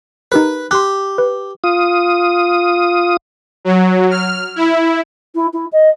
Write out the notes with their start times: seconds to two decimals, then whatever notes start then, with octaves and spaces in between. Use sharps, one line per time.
0.32 D#4 G4 A#4 B4
0.71 G4 C6 D6 F#6
1.18 B4
1.64 F4 D#6
3.65 F#3
4.10 F6
4.56 E4
5.35 E4
5.53 E4
5.72 D#5